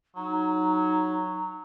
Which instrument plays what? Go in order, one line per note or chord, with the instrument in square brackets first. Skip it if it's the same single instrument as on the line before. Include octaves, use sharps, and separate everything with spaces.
[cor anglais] F#3 [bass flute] D#4 [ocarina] A#5